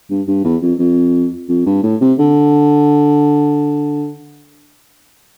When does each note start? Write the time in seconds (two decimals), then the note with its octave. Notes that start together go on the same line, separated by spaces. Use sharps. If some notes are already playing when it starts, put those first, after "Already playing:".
0.10 G2
0.27 G2
0.45 E2
0.62 F2
0.79 F2
1.49 F2
1.66 G2
1.83 A2
2.01 C3
2.19 D3